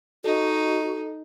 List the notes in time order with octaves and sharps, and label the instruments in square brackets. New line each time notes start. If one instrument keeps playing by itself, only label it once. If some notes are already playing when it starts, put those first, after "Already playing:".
[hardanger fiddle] D#4 [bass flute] F#4 [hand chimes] A4 D#5